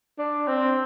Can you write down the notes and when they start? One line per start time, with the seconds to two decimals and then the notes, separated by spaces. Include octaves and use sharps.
0.18 D4
0.47 C4